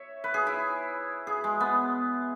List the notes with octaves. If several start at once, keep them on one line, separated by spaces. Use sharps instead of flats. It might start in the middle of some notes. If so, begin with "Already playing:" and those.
Already playing: C#5 E5
B4
G#4
E4
G#4
G#3
B3